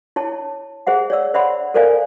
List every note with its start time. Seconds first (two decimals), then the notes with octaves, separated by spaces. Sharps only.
0.16 E4 C#5 A5
0.87 G#4 C5 E5 F#5
1.10 C#5 D5 E6
1.34 C5 D5 E5 F#5 B5 C6
1.74 A4 A#4 C5 D5 F5 G#5